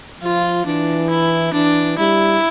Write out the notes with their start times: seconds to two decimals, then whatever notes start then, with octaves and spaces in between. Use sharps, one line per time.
0.21 F3 F4
0.66 E3 D4
1.10 E4
1.53 E3 D4
1.98 G3 E4